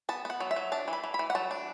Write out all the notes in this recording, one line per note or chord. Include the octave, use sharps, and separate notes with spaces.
B3 A5
B3 F#5
F#3
E5
F#3
D4 A5
E3
B5
E3
B5
E3
F#5
F#3 A5
D4